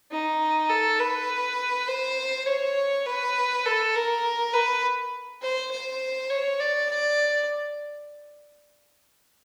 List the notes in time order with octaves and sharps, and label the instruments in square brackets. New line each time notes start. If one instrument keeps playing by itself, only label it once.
[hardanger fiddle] D#4
A4
B4
C5
C#5
B4
A4
A#4
B4
C5
C5
C#5
D5
D5